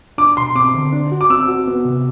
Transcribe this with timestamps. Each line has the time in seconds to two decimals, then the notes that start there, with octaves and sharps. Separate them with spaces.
0.18 D4 D6
0.37 B2 C6
0.55 C4 D6
0.74 D3
0.93 D4
1.12 F#4
1.21 D6
1.30 C4 E6
1.48 F#4
1.68 B3
1.85 C3